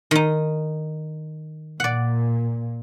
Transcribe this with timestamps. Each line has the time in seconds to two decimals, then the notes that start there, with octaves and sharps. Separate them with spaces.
0.11 D#3 D#4
1.80 A#2 D5 F#5